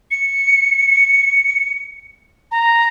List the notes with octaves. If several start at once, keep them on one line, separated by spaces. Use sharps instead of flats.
C#7
A#5